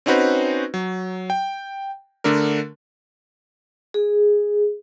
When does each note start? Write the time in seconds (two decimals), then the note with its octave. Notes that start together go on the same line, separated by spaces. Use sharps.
0.06 C4 C#4 D#4 F#4 B4 C5
0.74 F#3
1.30 G5
2.24 D3 A3 D4 A#4
3.94 G#4